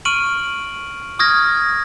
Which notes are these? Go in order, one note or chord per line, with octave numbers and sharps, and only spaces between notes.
C#6 F6 D7 D#7 F#7
C#6 D#6 F6 G#6 A#6